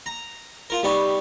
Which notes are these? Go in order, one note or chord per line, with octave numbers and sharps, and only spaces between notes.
A#5
F4 A#4
G3 B3 D#4 G4 G5 C#6